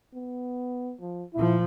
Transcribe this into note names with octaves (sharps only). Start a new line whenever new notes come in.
B3
F3
A#2 F3 E4